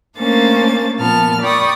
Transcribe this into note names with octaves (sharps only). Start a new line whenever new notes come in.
A3 A#3 C#4 D4 C5 A6
A#2 F3 B3 A5 F6
D5 G5 B5 C#6 D#6